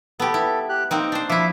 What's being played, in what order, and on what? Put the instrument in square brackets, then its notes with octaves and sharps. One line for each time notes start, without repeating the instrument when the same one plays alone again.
[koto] B3 G4 [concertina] A4
[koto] E4
[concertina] G4 F#6
[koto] A#3 C4 D#4 [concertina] G5
[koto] D4 C5
[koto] F3 E4 [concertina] E5 D6